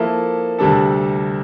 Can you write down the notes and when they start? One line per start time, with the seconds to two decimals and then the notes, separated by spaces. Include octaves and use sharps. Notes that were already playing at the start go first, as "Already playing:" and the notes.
Already playing: F3 A#3 E4 A4
0.59 D2 C3 G3 D4 A4